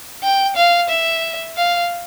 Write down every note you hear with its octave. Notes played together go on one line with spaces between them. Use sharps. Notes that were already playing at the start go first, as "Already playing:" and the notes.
G5
F5
E5
F5